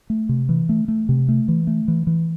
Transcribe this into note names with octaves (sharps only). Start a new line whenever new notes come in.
A3
C3
E3
A3
A3
C3
A3
E3
A3
E3
E3